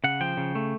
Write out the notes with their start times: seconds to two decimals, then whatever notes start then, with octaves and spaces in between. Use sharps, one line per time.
0.04 C#3 F#5
0.21 F3 G5
0.37 C#3
0.55 A3